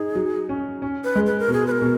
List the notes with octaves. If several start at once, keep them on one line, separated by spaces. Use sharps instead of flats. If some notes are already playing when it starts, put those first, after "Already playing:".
Already playing: D#4 G#4
F#3
C#4
C#4
B4
G#3
B4
A#4
B2
G#4
B4
A#4
B2